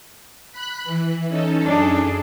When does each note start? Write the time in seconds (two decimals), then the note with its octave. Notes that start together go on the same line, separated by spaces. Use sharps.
0.52 B5 F#6
0.84 E3
1.29 C#4 D#4 A4
1.65 F#2 D4 G#4